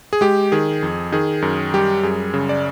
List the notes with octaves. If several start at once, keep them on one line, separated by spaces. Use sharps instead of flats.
G#4
G#3 G4
D#3 G#4
F2
D#3 G#4
F#2
G3 G4
F#2 G#4
C#3
D5